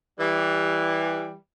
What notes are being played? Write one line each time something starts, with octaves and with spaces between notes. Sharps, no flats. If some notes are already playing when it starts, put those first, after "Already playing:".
E3 G3